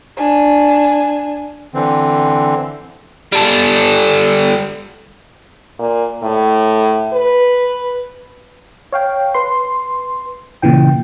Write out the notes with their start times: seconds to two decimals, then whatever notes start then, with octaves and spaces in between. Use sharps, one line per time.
0.17 D4 G#5
1.74 D3 E3 C4
3.32 G3 A4
5.79 A#2
6.23 A2
7.13 B4
8.92 C#5 F5 G5
9.34 B4 C6
10.62 A#2 C#3 E3 G5